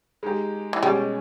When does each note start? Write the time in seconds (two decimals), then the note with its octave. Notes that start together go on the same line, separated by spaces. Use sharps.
0.23 G#3 D#4 G4
0.73 E3
0.82 B2 G3 G#3 C#4 G#4